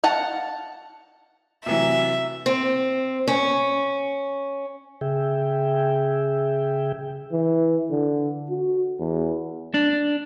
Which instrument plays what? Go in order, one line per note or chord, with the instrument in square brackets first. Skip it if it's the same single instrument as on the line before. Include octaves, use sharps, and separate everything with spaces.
[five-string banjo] F5 F#5 A5
[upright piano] C3 E3 F#3 [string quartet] E5
[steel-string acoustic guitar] C4
C#4
[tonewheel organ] C#3 G#4 E5 G5
[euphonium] E3
D3
F#4
E2
[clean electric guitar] D4